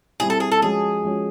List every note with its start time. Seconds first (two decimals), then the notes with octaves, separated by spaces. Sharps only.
0.20 G3 C4 E4 G4 G#4
0.30 A4
0.40 G#4
0.52 A4
0.62 F3 G#3 C#4 F#4 G#4
1.03 F3 G#3 C#4 F#4